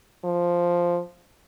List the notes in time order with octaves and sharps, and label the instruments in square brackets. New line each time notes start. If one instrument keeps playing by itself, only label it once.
[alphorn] F3